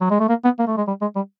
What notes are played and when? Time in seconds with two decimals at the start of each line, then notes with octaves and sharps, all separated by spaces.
0.01 F#3
0.10 G#3
0.20 A3
0.29 A#3
0.44 B3
0.59 A#3
0.67 A3
0.77 G#3
0.87 G3
1.01 G#3
1.16 G3